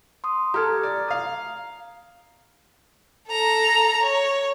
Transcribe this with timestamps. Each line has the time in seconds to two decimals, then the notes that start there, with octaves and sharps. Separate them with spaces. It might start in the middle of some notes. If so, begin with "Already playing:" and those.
0.24 C6 D#6
0.54 G4 A4 A#5 F6 G#6
0.83 D5
1.08 F5 D#6
3.29 A4 A#5
4.02 C#5